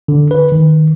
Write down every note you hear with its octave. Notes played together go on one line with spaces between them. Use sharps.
D3
B4
D#3